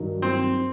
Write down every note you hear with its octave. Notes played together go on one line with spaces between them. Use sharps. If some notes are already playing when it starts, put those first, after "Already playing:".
Already playing: G2 D#3 F#3
C4